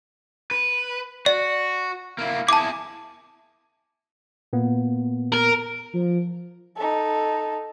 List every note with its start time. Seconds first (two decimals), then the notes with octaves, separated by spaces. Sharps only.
0.51 B4
1.26 F#4 D5
2.18 A#3 E4
2.49 E4 G#4 A5 D6
4.53 A#2 A#3 B3
5.32 A#4
5.93 F3
6.76 D#4 A4